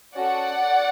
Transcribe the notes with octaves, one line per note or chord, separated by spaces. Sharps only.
C#4 F#4 A4 D5 F#5